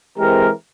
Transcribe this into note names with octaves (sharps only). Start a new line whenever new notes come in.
E3 G#3 C4 G4 A#4